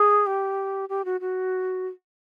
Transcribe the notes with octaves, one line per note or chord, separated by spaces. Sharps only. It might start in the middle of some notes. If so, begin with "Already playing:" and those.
Already playing: G#4
G4
G4
F#4
F#4